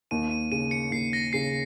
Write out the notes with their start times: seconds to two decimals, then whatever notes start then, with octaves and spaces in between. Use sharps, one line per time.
0.11 D#2 D#7
0.31 D#7
0.52 C#3 D#7
0.71 C#7
0.92 D#2 C7
1.13 A#6
1.33 C#3 C7